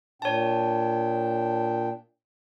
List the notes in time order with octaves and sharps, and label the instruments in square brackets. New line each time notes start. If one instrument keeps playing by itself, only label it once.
[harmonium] A#2 D4 G5 [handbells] C#5 A5